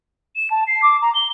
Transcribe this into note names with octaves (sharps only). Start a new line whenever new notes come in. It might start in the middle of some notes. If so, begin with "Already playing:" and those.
E7
A5
C7
D6
A#5
G7